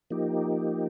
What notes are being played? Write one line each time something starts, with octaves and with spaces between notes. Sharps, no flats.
F3 A#3 D#4 G4